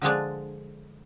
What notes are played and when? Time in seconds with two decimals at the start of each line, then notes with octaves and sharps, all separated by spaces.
0.01 D3 F3 G#3 D4